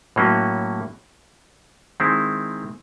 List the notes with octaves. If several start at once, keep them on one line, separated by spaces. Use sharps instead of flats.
A2 F#3 A#3 C#4
D#3 G#3 C4 E4